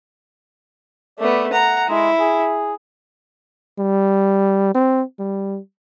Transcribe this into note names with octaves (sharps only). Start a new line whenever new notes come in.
A3 B3 D5
F#5 A#5
G#3 E4
G#4
G3
C4
G3